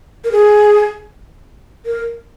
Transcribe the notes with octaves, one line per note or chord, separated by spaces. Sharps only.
A#4
G#4
A#4